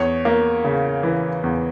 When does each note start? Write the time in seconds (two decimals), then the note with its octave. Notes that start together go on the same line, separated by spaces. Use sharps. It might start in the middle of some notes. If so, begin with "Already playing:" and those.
Already playing: E2 C#5 C#6
0.25 A#3
0.64 C#3
1.03 E3
1.44 E2